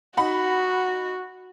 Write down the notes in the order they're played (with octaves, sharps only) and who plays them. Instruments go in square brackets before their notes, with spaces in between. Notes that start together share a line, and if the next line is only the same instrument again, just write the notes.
[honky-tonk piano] D#4 F#5 B5 [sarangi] F#4